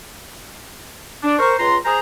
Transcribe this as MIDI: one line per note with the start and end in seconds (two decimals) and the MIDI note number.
1.23 1.37 62
1.39 1.53 70
1.39 1.53 72
1.39 1.53 85
1.58 1.76 37
1.58 1.76 65
1.58 1.76 71
1.58 1.76 82
1.58 1.76 84
1.85 1.99 68
1.85 1.99 72
1.85 1.99 82